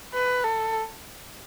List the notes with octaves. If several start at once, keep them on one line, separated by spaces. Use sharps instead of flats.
B4
A4